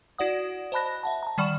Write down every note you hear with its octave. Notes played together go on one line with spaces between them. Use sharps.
E4 F#4 D5 F#5 D#6
C5 D#5 A5 B5 F#6 A#6
E5 F#5 A5
A5 A#5
D#3 G3 D5 F#5 C#6 E7